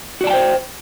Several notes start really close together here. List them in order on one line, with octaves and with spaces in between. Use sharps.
F#4 D5 A5 G5 C5